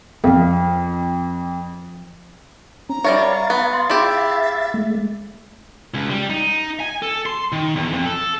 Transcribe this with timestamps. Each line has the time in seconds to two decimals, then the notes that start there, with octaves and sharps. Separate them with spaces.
0.24 F2 F3 F5
2.89 C#4 A#5
3.04 G3 A#4 C#5 E5 F5 A6
3.50 B3 C#6
3.73 C6
3.90 E4 F4 G4 G#4 E5 C6
4.74 G#3 A3
5.94 C#2
6.10 G3
6.30 D#4
6.80 G#5
7.02 A4
7.26 C6
7.52 D#3
7.76 E2
7.92 F2
8.06 A4